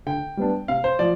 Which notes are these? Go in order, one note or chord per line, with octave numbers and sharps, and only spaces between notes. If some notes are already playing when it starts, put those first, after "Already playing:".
D3 G5
G3 B3 D4
C3 F5
C5
F3 D5